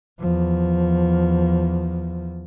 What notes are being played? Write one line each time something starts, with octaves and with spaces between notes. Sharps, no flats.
E2 F3